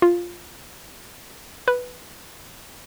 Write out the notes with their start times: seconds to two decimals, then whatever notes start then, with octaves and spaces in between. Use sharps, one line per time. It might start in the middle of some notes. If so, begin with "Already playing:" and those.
0.02 F4
1.68 B4